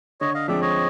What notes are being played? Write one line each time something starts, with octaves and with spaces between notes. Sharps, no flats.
D3 C#5 D#5
D#5 F5
F3 G#3 C4 D5 E5
C#5 D#5